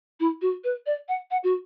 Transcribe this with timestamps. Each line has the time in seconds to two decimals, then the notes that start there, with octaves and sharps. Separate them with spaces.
0.20 E4
0.42 F#4
0.64 B4
0.86 D5
1.09 F#5
1.31 F#5
1.44 F#4